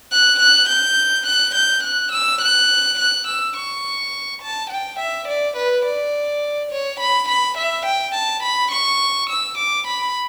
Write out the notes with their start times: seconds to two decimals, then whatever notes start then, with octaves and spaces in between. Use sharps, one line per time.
0.12 F#6
0.40 F#6
0.69 G6
1.27 F#6
1.55 G6
1.84 F#6
2.12 E6
2.42 F#6
2.99 F#6
3.27 E6
3.57 C#6
4.42 A5
4.71 G5
5.00 E5
5.28 D5
5.56 B4
5.85 D5
6.72 C#5
7.00 B5
7.29 B5
7.58 E5
7.86 G5
8.15 A5
8.43 B5
8.72 C#6
9.30 E6
9.58 D6
9.87 B5